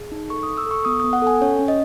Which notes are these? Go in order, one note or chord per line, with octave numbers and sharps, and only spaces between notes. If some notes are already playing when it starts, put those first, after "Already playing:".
Already playing: G#4
D#4
A4 C#6
D#6
A4
E6
A4 C#6
B3 D#6
D#6
B3
F#5
A4 G#5
C#4 C#5
C#4
D#5